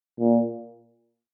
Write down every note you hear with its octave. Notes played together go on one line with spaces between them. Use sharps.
A#2